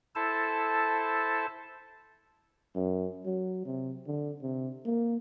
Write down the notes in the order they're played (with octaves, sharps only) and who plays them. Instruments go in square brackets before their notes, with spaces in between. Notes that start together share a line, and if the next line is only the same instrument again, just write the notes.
[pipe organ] E4 A4 C5 A5
[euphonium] F#2
F#3
C3
D3
C3
A#3